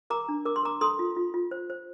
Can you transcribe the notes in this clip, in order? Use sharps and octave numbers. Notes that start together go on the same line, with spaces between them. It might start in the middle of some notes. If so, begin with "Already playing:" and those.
A#4 A#5 D6
D4
A#4 D6
C6
A#4 A#5 D6
A4 C6 D#6
F4
F4
F4
C5
C5